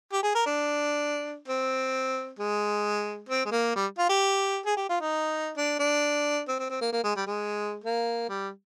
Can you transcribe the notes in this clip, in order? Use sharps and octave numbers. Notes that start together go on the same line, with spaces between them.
G4
G#4
A#4
D4
C4
G#3
C4
G#3
A#3
G3
F4
G4
G#4
G4
F4
D#4
D4
D4
C4
C4
C4
A#3
A#3
G#3
G3
G#3
A#3
G3